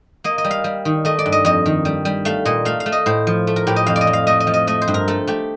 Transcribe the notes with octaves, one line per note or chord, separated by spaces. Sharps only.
A#3 D#5
D#5
G3
F5
G3
D#3
A3 D#5
D5
G2
D#5
F2 D#5
D#3
G3
G3
A3 F5
A#2 D#5
A3 F5
F5
A3
D#5
A2 C5
F3
A3
A#4
A2 G4
D#5
F2 F5
D5
D#5
F2
F5
A3 D#5
D#5
F3
D#5
A3 D#5
C5
G2
A#4
A3 A4
A3 G4